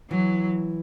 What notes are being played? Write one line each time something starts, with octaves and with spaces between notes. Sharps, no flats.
E3 F#3